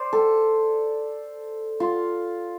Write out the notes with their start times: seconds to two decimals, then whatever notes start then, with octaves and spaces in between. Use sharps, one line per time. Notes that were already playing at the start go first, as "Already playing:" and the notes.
Already playing: C5 D5
0.13 A4
1.80 F4